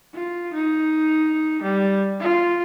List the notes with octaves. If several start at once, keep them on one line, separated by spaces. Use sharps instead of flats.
F4
D#4
G3
F4